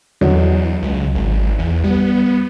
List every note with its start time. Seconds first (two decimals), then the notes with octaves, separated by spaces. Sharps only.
0.21 E2 D3 F#3 D#5
0.82 C#2
1.15 G#1
1.59 E2
1.84 G3 B3